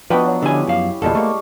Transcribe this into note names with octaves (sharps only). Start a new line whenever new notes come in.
F3 B3 D4 F#4 B4 D#5 G5 B5
F#3
D3 C#4 E4 G4 G#5
F#2 F5
G1 E2 A#2 G3 G#3 A4 F5
A3 A#3 C#6 D6